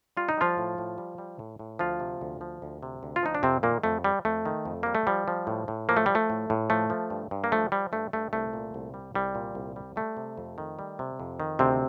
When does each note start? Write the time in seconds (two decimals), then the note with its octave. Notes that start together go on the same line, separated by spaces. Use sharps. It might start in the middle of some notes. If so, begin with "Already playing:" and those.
0.17 G3 F4
0.29 D#4
0.37 F3 G3 F4
0.58 A2
0.78 A2
0.98 G3
1.18 G3
1.39 A2
1.59 A2
1.79 D2 F3 F4
2.00 C3
2.21 D2
2.41 F3
2.62 D2
2.83 C3
3.03 D2
3.16 F4
3.23 F3 D#4
3.35 D4
3.43 F2 C3 C4
3.63 A#2 D#3 A#3
3.84 F2 A3
4.04 G3
4.25 F2 A3
4.46 D#3
4.65 F2
4.83 G3 A#3
4.95 A3
5.07 F3 G3
5.28 F3
5.47 A2
5.68 A2
5.89 F3 A#3
5.97 A3
6.06 F3 G3
6.15 A3
6.30 A2
6.50 A2
6.70 F3 A3
6.90 F3
7.10 G2
7.31 G2
7.44 A#3
7.52 F3 A3
7.72 F3 G3
7.92 G2 A3
8.13 G2 A3
8.33 C2 A3
8.53 A#2
8.74 C2
8.94 G3
9.14 C2 G3
9.35 A#2
9.55 C2
9.76 G3
9.96 G3 A3
10.17 C3
10.37 F2
10.58 D#3
10.79 G3
10.99 C3
11.20 F2
11.40 D#3
11.59 D2 C3 C4